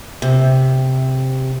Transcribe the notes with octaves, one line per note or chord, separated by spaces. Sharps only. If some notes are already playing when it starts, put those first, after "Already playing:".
C3